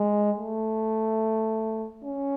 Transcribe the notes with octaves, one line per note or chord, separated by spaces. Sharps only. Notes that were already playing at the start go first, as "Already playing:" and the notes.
Already playing: G#3
A3
C#4